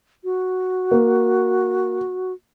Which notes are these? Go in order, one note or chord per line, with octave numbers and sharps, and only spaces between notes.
F#4
A#3